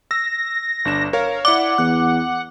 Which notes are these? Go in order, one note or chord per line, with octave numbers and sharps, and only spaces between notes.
E6 A#6
G1 D4 E7
A#4 C#5 F5
E4 D5 F#5 D6
E2 F#6